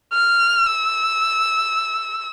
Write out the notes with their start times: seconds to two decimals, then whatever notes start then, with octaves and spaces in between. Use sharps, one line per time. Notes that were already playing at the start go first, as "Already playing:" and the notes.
0.14 F6
0.66 E6